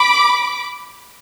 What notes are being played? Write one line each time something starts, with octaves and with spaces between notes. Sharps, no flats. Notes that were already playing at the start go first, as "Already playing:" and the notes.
Already playing: B5 D6